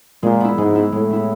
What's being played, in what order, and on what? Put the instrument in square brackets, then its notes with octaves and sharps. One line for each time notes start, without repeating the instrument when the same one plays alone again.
[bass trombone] A#2 [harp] G#3
[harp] B3 E4
[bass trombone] G#2 [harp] G#3
[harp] B3 E4
[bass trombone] A2 [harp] G#3
[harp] B3 E4